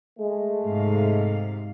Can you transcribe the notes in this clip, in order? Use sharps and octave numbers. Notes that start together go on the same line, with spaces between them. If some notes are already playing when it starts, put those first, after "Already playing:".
G#3 A3
G#2 C3 F5